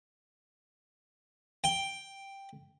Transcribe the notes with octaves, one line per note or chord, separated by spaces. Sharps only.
G5